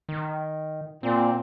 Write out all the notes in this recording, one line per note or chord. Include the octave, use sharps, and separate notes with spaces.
D#3
A#2 C4